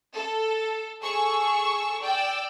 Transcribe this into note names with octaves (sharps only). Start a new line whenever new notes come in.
A4
G#4 A4 C#6 E6
D5 G5 E6